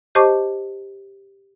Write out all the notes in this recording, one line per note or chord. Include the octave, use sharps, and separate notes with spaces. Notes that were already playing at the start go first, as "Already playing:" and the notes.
G4 C5 D#5 A5 C#6 D6